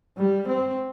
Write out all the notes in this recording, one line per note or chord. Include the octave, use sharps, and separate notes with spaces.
G3
C4